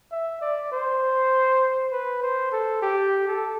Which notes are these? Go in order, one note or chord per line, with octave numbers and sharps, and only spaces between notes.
E5
D5
C5
B4
C5
A4
G4
A4